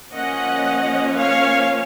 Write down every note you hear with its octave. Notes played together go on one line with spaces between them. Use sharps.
F3 A#3 C#4 D#5 F#5
C#5 F5